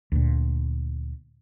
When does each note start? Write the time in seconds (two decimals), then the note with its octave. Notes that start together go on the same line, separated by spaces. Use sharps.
0.12 D2 A#2